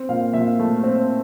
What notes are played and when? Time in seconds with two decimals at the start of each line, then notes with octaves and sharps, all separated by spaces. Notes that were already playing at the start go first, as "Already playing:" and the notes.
Already playing: C4
0.09 A#2 F5
0.33 A#2 E5
0.59 A3
0.84 C4